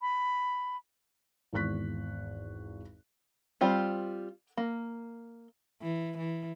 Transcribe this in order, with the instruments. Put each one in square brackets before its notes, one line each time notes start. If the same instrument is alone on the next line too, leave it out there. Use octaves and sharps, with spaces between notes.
[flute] B5
[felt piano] G#1 E2 C#6 F#6 B6
[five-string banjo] G3 C4 F4 C5
A#3
[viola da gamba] E3
E3